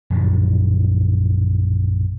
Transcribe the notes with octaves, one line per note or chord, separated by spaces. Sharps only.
A#1 F#2 A2 D3